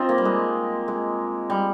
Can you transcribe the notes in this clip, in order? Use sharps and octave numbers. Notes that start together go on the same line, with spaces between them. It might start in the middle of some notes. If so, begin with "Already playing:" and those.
Already playing: C4 D#4 F4
A#3
G3
G#3
G#3
G3